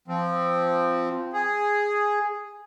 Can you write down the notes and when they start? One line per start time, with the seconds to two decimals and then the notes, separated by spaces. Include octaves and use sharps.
0.08 F3 C4
1.33 G#4